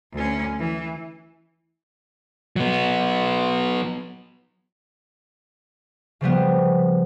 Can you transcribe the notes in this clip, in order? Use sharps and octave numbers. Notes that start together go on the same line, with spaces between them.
D2 C#4
E3
F#3 B3
C#3 F3 G3 B3